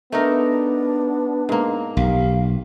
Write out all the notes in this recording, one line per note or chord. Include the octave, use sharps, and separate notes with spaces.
A3 B3 D4 D#4 A#4
G#2 A#3
B1 G4 F5